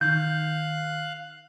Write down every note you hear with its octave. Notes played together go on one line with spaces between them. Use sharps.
D#3 F5 F#6 G6